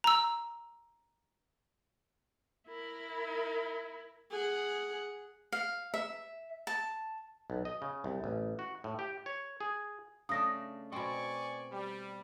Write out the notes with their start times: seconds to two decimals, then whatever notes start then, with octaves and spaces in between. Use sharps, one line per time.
0.04 A#5 E6
2.67 E4 A#4
4.30 G#4 F#5
5.52 F5
5.94 E5
6.67 A5
7.50 B1
7.65 D#5
7.82 C#3
8.04 C2
8.24 A1
8.59 F#4
8.84 A2
8.99 G4
9.26 C#5
9.61 G#4
10.29 C#3 A3 D4 D#6 A#6
10.92 B2 C4 D5 G#5 C#6
11.71 G3